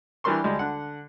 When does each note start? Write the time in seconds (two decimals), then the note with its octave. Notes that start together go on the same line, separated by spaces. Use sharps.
0.24 E3 G3 D4 A#4 C6 C#6
0.44 D2 G3 G#3
0.59 D3 F#5